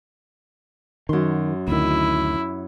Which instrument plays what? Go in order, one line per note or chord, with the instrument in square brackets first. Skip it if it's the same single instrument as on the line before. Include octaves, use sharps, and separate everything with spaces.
[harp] F#2 C6 [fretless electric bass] D#3
[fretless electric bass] D2 D#3 [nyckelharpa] E4